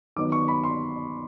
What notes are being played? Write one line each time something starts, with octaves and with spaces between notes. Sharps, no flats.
D#3 F#3 B3 D#4 D6
C#6
B5
C6